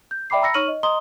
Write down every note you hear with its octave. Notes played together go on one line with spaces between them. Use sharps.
G6
D5 E5 G5 B5 D6 C7
A#5 B5 E6 A#6 C#7
D#4 C#5 C#6 F6 D#7 F#7
D#5
D#5 A#5 C6 D#6 G7